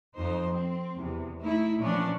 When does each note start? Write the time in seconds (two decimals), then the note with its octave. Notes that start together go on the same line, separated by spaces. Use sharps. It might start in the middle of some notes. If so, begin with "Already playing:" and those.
0.17 F2 D#4 C5
0.52 C4
0.98 E2 C3
1.40 A3 D#4 E4
1.79 A#2 E3 F3 C#4 D4